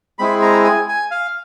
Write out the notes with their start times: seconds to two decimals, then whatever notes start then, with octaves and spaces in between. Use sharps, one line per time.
0.19 G#3 C4 E4 G#4 B5
0.42 A#5
0.65 G#5
0.88 G#5
1.11 F5